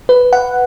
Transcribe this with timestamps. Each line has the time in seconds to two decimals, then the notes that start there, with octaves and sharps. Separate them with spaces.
0.09 B4
0.33 F#5